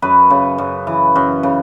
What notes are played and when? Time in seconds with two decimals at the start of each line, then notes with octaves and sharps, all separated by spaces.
0.02 F#2 B4
0.30 C#3
0.58 F#2
0.87 E3
1.16 F#2
1.43 C#3